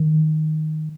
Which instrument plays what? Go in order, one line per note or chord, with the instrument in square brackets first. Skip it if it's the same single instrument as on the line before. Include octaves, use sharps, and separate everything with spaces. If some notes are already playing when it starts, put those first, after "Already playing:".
Already playing: [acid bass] D#3